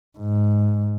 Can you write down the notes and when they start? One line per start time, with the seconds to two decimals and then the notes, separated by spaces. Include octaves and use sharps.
0.18 G#2